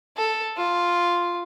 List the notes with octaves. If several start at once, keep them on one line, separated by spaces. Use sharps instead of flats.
A4
F4